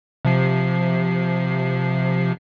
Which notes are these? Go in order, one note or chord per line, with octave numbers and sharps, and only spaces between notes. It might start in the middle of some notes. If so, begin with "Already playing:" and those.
C3 F3 C7